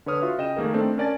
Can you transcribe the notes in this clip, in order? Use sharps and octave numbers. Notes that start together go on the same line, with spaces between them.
D3 B4 C#5 D#6 F6
F4 F#4 E5
C#3 D#5 G5 E7
D#3 A3 A#3 G#4 A#4
A3 C4 D4 D#4 A4
C#4 A#4 D5 G#5 A5 A6